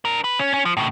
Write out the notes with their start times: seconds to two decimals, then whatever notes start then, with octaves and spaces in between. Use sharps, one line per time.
0.05 D4 A#4
0.24 B4
0.39 C#4
0.54 C#4
0.65 F3
0.77 A2 C#3